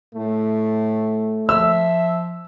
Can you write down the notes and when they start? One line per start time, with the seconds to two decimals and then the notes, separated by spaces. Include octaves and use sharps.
0.15 A2 A3
1.49 F3 E5 E6